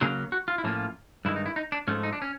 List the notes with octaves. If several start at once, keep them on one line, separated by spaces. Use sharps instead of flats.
C#3 F#3 A#3 C#4 G#4
F#4
F4
E4
A2 F3 A#3 C#4 F4
G2 D#3 G#3 E4
D#4
E4
D#4
D4
G#2 F3 A3 C#4
D#4
D4
C#4